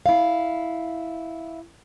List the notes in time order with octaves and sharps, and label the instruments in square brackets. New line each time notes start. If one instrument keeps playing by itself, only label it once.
[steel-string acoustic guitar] E4 F5